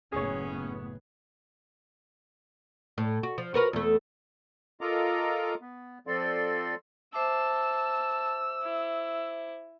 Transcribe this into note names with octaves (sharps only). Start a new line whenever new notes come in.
F#1 A2 B3 C#4 G#4 C#5
A2
F#4
F3
F#4 A#4 B4
E2 A3
F4 A4 A#4 D#5 A#5 D6
B3
F3 C4 A4 D5 C6
C5 E5 A5 D6 E6
E4